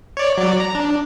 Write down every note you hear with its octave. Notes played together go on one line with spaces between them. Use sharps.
C#5 D5
F#3 D5
A#5
D4